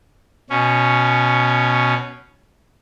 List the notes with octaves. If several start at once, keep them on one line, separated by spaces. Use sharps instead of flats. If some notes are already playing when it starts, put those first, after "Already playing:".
B2 C#4